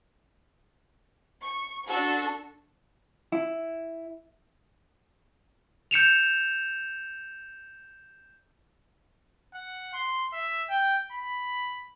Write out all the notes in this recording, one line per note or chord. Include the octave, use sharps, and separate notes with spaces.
C#6
D4 F#4 A4 C#6
E4
G6 C#7 E7 F7
F#5
C6
E5
G5
B5